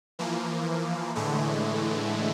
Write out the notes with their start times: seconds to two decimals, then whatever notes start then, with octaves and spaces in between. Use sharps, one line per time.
0.19 E3 F3 A#3
1.15 A2 D3 E3 G#3 A3